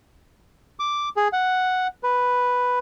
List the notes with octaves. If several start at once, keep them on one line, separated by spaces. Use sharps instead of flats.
D6
G#4
F#5
B4